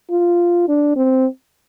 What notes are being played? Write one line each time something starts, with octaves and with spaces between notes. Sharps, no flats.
F4
D4
C4